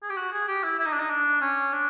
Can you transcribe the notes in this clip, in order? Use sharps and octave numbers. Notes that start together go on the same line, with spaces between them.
G#4
G4
F#4
G#4
G4
E4
E4
D#4
D4
D#4
D4
C#4
D4